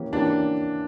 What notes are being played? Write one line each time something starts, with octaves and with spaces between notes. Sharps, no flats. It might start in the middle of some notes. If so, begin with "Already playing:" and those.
Already playing: E3 A#3 C#4 G4
E3 A#3 C#4 D4 G4